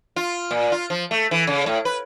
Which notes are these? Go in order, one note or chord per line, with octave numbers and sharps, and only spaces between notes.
F4
A#2
F4
F3
A3
E3
C#3
A2
B4